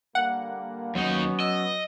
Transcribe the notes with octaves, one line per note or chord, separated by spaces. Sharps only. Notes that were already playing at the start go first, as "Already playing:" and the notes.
D3 G3 A#3 F#5
D#2 F#3 B3 C#4 D#4 F#4
D#5 E6